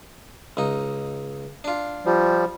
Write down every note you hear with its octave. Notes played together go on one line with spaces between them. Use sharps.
C#2 D#4
D4 F4
F3 G3